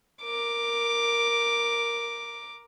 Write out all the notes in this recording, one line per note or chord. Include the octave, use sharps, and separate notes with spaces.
A#4 D6